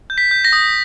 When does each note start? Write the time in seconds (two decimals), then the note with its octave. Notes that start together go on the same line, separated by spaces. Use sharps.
0.10 G6
0.18 B6
0.31 G6
0.45 A#6
0.53 D#6